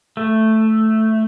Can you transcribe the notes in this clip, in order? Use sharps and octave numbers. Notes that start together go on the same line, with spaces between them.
A3